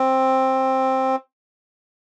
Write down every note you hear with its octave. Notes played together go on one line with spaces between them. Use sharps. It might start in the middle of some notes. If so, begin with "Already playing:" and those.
Already playing: C4